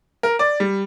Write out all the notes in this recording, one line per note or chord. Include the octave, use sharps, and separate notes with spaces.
A#4
D5
G3